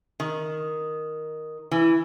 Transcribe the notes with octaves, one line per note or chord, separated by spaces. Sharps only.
D#3
E3